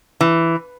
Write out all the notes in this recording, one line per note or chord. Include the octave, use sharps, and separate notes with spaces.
E3